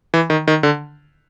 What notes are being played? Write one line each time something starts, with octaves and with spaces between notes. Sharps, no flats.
E3
D#3
D#3
D3